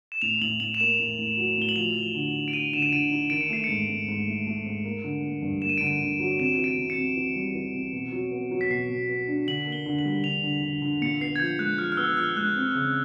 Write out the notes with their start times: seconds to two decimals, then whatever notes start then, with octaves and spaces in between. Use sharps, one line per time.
0.12 E7
0.22 A2 F7
0.41 A2 F#7
0.60 A2 F#7
0.74 E7
0.80 A#3 F7
0.99 A2
1.18 A2
1.37 F#3
1.58 A2 G7
1.69 F#7
1.76 F3 F7
1.96 F3
2.15 D3
2.35 D#4
2.48 D7
2.53 D#4 D#7
2.73 D3 E7
2.82 D#7
2.92 D3 D7
3.12 D#4
3.30 D#3 D7
3.41 C#7
3.50 A3 C7
3.64 G#2 C#7
3.89 G#2
4.08 G#2
4.27 A3
4.47 A3
4.66 G#2
4.84 A#3
5.04 D3
5.23 A#3
5.42 G2
5.62 A#3 E7
5.69 D#7
5.78 D7
5.81 D3
5.87 D#7
6.00 D3
6.19 F#3
6.39 C3 E7
6.58 E3
6.64 D7
6.78 C3
6.90 C#7
6.97 C3
7.16 E3
7.36 G3
7.55 E3
7.74 C3
7.93 B2
8.12 F#3
8.32 B3
8.51 F#3
8.61 B6
8.70 B2 C7
8.90 B2
9.09 B3
9.28 D4
9.47 D3 F#7
9.66 A#3
9.72 G7
9.86 D3
9.99 F#7
10.05 G3
10.24 D3 F7
10.43 D3
10.62 D3
10.82 D3
11.02 A#2 C#7
11.21 B3 C7
11.36 G#6
11.40 F3 G6
11.59 G#3 F#6
11.78 F3 F6
11.92 F6
11.97 B3 E6
12.17 F3 F6
12.36 G#3 F#6
12.56 C4
12.75 C#3